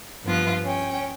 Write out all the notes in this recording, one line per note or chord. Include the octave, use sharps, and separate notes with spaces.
G2 F3 B3 F4 F#6
C#4 G5